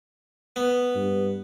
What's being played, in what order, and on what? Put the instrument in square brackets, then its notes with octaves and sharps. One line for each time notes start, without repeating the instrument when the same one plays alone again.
[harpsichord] B3
[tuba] G2